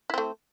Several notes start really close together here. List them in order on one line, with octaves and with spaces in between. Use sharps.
E4 C4 A3